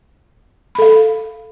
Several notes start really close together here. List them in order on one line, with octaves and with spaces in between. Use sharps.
B5 A4 F5